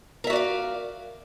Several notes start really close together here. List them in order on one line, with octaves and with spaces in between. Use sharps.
A#4 E5 F#4 D5 F5